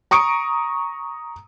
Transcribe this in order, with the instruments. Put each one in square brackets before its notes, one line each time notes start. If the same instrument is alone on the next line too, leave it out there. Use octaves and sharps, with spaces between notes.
[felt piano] A#5 C#6 D#6 C#7 D7